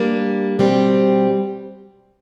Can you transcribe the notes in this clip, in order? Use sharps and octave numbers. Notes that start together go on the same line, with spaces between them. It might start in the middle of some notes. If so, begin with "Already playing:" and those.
Already playing: G3 A#3 D4
B2 G3 C4